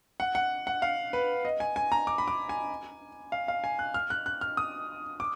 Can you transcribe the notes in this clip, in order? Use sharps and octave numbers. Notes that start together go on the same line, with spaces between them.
F#5
F#5
F#5
F5
B4
D#5
G#5
G#5
A#5
D6
B5
D6
G#5
F5
F5
G#5
F#6
F6
F#6
F#6
F6
D#6
D6